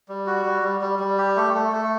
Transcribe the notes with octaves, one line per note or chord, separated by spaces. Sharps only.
G3
F#4
G3
G3
G3
G3
G4
A3
A3
A3